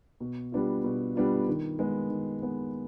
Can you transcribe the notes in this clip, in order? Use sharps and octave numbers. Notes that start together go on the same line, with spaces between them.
B2
G3 B3 D4 F4
B2
G3 B3 D4 F4
D#3
G#3 B3
D#3
G#3 B3